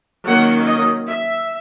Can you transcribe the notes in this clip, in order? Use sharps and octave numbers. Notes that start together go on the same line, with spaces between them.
D#3 F#3 A#3 C#4 F#5
D#5
E5